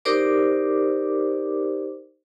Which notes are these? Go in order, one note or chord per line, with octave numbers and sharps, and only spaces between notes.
D#4 G4 A#4 C5 D5 D6